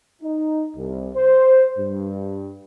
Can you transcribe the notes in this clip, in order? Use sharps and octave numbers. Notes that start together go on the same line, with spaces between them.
D#4
C2
C5
G2